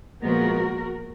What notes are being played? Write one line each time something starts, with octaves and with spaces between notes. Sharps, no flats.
A#2 F3 G#3 B3 F#4 A#4